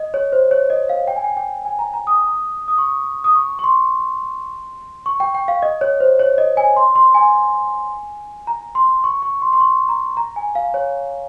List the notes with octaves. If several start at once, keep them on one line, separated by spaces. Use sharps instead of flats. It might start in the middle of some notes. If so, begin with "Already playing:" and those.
Already playing: D#5
C#5
C5
C#5
D#5
F5
G5
G#5
G5
G5
G#5
A#5
A#5
D#6
D#6
C#6
D#6
C#6
C#6
C6
C#6
G5
G5
F5
D#5
C#5
C5
C#5
D#5
G#5
C6
C6
G#5
A#5
C6
C#6
C#6
C6
C6
C#6
A#5
A#5
G#5
F5
C#5